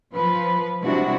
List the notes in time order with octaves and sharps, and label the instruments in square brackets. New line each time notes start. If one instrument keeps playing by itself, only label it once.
[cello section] F3 B4
C3 G3 G#3 D4 E4 F#4